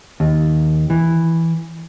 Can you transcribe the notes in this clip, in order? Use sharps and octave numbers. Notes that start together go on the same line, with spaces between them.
D#2
E3